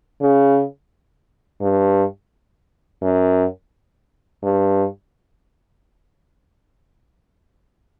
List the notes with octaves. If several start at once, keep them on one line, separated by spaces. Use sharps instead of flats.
C#3
G2
F#2
G2